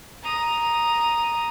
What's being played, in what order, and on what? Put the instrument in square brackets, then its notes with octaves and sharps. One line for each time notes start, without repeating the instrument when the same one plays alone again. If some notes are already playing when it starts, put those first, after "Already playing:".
[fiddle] A#5 D#6